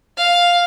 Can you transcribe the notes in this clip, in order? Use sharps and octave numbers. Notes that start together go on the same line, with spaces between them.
F5